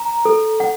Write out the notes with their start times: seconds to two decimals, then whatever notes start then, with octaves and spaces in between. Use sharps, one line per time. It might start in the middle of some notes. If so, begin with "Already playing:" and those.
Already playing: A#5
0.25 A4
0.60 F#5